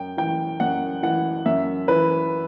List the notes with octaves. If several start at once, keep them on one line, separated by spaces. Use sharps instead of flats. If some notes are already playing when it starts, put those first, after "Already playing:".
Already playing: F#2 G5
E3 G5
F#2 F#5
E3 F#5
F#2 E5
E3 B4